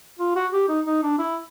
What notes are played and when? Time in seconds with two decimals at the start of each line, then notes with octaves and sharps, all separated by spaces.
0.19 F4
0.36 F#4
0.53 G4
0.69 D#4
0.86 D#4
1.02 D4
1.18 E4